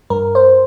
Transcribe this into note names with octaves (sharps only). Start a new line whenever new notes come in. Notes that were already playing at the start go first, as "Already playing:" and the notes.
G2 A#4
C5